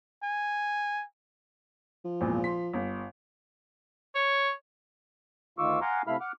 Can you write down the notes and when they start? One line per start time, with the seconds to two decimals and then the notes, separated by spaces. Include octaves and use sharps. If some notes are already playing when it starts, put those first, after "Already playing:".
0.23 G#5
2.05 F3
2.21 G#1 E2 A#2
2.44 C6 B6
2.73 G1
4.15 C#5
5.58 D2 D#3 F4 C#6 D6 E6
5.81 F5 F#5 G#5 A#5 C6 D6
6.07 C3 A3 E4 F5 B5 F6
6.20 F#5 D6 F6